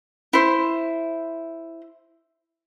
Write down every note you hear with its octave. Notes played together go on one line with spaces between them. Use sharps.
E4 C5